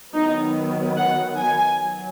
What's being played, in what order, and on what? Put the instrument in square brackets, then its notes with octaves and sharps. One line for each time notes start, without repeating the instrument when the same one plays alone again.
[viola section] D#3 F#3 B3 D#4
F#5
G#5
F#3